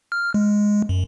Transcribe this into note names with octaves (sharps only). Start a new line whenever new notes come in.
F6
G#3
F#2